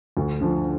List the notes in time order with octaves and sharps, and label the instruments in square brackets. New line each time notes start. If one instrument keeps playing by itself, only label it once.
[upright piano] D2
D3 F3